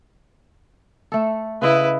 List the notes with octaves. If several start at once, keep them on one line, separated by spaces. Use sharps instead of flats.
A3 A4
C#3 E4 B4 D#5